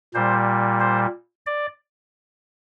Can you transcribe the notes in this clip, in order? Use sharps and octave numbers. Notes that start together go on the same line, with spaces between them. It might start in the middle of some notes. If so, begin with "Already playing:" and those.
A#2 G3 C5
C5
D5